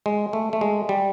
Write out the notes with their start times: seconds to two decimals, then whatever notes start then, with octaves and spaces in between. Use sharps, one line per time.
0.06 G#3
0.33 A3
0.53 A3
0.61 G#3
0.89 G3